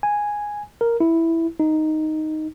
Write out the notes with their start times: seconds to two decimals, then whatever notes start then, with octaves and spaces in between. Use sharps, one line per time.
0.03 G#5
0.81 A#4
1.00 E4
1.60 D#4